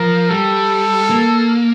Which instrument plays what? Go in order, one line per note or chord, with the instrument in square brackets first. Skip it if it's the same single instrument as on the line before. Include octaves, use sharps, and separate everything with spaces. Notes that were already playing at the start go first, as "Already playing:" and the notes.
Already playing: [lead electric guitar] F3 [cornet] A#4
[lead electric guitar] G3 [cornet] A4
[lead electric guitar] A#3